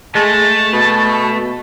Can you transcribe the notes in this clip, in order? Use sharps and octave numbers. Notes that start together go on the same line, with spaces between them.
G#3 A3 A5
B2